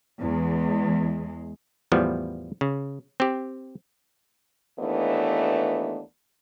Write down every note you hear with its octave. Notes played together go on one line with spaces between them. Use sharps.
E2 G#3
E2 A2 F3 G3 B3
C#3
C4 G4
D#2 E3 A3 B3 D4